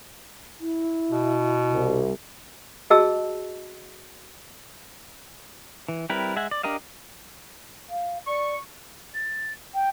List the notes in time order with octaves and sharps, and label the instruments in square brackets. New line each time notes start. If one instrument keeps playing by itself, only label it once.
[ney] E4
[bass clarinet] B2
[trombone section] C2
[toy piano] F#4 G#4 D#5 A5 E6
[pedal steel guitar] E3
G3 C4 E4 A#4 B4
G#3 E5 F#5 G#5
D5
D4 G4 A#4 D#5 F5
[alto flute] F5
[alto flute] D5 [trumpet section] C#6
[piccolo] A6
G5